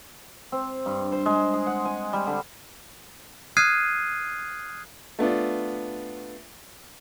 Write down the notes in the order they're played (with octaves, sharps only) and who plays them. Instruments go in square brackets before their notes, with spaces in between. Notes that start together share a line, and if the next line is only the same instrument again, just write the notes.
[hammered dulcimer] C4
G2
C5
G#3
G#4
F#5
G#5
G3
D3
[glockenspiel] D#6 F6 F#6 G#6 C7 D#7
[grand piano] A3 B3 D4 F4